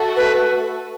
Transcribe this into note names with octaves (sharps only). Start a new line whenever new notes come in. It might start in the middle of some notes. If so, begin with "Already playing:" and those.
Already playing: A3 F#4 A4
B4